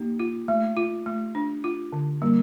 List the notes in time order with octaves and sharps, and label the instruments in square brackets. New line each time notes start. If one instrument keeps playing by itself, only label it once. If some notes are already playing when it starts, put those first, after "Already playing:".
Already playing: [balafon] A#3 [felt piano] D#4 G4
[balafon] F4
A3
F4
A3
D4
F4
D3
[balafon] G3 [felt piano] A#3